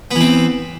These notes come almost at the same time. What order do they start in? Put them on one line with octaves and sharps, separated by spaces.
B3 E3 C4